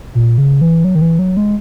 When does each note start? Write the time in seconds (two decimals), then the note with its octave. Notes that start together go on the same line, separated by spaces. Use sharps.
0.15 A#2
0.38 C#3
0.61 E3
0.84 F#3
0.95 D#3
1.01 E3
1.19 F#3
1.37 G#3